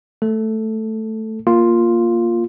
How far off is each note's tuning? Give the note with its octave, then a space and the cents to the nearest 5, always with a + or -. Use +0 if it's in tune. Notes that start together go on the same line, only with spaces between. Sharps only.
A3 +0 A4 +0
A#3 +0 F4 +0